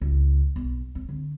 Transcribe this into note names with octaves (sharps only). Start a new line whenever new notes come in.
C#2
B1
C4
D3